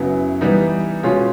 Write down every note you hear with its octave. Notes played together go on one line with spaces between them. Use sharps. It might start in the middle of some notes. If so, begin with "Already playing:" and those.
Already playing: F#2 C#3 F#3 B3 E4
E3 G3 B3 D#4
B2 G#3 C#4 F4